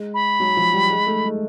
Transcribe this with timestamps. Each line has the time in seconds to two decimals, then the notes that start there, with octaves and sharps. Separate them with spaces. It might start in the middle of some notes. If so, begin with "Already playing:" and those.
Already playing: G#3
0.14 B5
0.40 F#3
0.57 F3
0.73 G3
0.90 G#3
1.07 A3
1.24 G#3